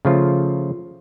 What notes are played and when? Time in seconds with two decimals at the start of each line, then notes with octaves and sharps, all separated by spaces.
0.05 C#3 F3 A3 F4